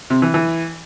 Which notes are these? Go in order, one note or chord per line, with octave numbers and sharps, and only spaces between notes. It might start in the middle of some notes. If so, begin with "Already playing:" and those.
C3
E3
E3